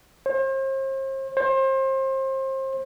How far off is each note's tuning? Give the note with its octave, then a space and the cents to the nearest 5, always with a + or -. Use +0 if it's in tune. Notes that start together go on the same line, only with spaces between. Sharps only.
C5 +40
C5 +30